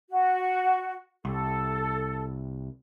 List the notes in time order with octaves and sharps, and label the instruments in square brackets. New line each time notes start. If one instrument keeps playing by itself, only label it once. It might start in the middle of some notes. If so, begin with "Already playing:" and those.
[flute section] F#4
[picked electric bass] C2 [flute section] A4